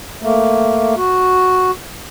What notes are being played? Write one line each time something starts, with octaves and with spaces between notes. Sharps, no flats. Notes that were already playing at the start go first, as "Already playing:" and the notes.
A3 A#3
F#4